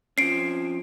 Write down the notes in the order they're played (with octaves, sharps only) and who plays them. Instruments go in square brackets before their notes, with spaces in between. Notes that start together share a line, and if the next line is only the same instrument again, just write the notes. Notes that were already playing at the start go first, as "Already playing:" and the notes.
[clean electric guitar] F3 C4 C#4 [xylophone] C7 D7